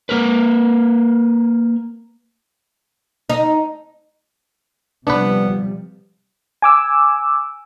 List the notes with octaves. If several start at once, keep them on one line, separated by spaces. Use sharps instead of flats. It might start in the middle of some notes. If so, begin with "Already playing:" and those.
A#3 A#4 B4
D#4
C3 F3 G3 B3 D4 B4
G#5 D6 E6